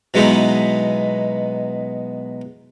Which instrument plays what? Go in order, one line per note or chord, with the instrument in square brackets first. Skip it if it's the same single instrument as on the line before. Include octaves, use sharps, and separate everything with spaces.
[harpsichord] B2 F#3 G#3 B3 D#4 E4